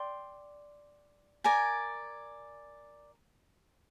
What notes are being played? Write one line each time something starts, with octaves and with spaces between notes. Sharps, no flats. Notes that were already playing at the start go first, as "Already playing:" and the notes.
Already playing: D5 G5 C6
A#4 D5 G#5